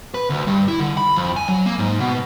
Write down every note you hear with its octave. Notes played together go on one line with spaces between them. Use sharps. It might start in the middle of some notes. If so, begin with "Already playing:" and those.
B4
D2
G2
E4
D3
B5
F2
G#5
F#3
A#3
G#2
B2